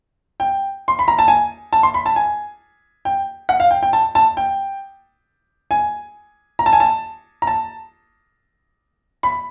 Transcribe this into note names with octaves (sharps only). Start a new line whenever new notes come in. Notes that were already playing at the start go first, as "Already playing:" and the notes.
G5
C6
B5
A#5
A5
G#5
A5
C6
B5
A5
G#5
G5
F#5
F5
G5
G5
A5
A5
G5
G#5
A#5
A5
G#5
A5
A#5
A5
B5